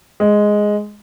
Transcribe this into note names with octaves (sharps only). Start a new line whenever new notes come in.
G#3